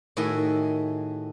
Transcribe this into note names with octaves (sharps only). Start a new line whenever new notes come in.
A2 D#3 F#4 G#4 D#5 E5